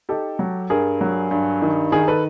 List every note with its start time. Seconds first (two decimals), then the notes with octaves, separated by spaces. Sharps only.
0.09 D#4 G4 A4
0.39 F#3
0.70 G2 G#4 A#4
1.01 F#3
1.31 G2
1.62 D#3
1.92 D#3 G#4 A#4
2.08 A4 B4